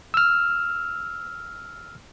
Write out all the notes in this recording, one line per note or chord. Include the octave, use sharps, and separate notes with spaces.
E6 F6